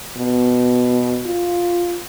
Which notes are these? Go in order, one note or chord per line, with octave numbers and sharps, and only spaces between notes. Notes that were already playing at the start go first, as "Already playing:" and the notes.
B2
F4